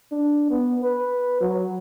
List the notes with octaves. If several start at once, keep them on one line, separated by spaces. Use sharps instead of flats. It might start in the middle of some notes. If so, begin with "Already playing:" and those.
D4
B3
B4
F#3